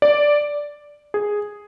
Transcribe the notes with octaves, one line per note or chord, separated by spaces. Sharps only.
D5
G#4